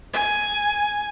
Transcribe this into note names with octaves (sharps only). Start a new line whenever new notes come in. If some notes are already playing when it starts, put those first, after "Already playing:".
G#5